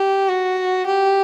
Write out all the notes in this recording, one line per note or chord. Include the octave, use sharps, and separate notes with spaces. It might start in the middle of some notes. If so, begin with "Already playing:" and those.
Already playing: G4
F#4
G4